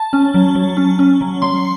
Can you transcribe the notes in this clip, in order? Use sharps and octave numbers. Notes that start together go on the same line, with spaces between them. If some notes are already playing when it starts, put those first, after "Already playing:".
Already playing: A5
C#4
F#3
F#3
C#4
C#4
F#3
F#3 C6